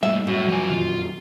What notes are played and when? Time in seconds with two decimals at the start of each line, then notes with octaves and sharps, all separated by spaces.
0.03 G#2 G3 A3 A#3 E5
0.27 F#2 A2
0.48 F3 G#5
0.70 F2 A#2 D#3 F4